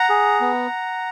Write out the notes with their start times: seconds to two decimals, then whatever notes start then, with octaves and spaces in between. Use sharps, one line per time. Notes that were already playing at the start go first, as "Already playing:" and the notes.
Already playing: F#5 A#5
0.09 G#4
0.41 B3